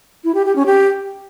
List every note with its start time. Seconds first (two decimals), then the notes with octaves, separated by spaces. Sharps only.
0.24 E4
0.35 G4
0.45 G4
0.56 C#4
0.66 G4